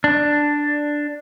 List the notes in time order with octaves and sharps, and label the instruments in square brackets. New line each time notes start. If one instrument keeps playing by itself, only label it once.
[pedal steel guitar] D4